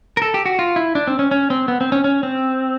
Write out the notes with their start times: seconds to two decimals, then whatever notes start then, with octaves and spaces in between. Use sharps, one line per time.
0.17 A#4
0.22 A4
0.34 G4
0.46 F#4
0.59 F4
0.76 E4
0.95 D4
1.07 C4
1.19 C#4
1.31 C#4
1.50 C4
1.68 B3
1.81 C4
1.92 C#4
2.04 C#4
2.23 C4